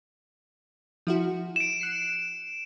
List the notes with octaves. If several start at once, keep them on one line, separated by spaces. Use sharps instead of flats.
F3 E4 F#4
D7 E7
F#6 C7 C#7